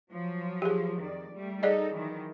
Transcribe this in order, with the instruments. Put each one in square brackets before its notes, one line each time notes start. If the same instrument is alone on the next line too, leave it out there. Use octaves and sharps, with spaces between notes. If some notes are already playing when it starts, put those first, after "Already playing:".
[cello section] F3 F#3
[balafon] G4 G#4
[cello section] F2 D#3 D5
G3 A3
[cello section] D#4 A4 [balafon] G#4 D5 D#5
[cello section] D#3 E3 F#3